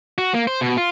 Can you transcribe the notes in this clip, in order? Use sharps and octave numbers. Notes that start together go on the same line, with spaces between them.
F#4
A#3
C5
B2
F4